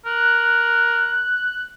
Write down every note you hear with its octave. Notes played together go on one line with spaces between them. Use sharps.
A#4 F#6